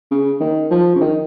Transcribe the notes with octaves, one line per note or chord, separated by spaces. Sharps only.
C#3
D#3
F3
C#3
D#3